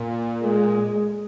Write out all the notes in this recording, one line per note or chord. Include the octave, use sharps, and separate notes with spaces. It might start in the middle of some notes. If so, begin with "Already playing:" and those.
Already playing: A#2
G#3